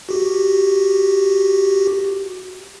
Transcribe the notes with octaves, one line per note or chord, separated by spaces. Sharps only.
F#4 G4